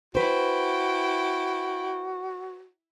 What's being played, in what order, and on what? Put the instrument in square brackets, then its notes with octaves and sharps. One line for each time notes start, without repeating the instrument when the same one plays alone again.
[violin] E4 G5 [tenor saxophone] F#4 [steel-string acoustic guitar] B4 C5